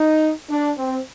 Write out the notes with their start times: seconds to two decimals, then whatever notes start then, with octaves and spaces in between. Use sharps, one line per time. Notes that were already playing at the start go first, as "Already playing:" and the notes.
Already playing: D#4
0.50 D4
0.78 C4